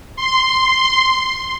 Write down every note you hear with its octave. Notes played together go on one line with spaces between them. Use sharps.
C6